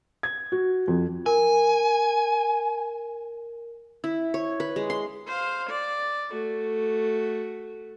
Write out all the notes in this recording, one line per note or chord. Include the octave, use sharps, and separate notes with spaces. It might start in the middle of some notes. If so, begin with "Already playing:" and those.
G#6
F#4
F2
A#4 G#5
E4
C#5
B4
G#3
C6
C5 F5
D5
A3 F#4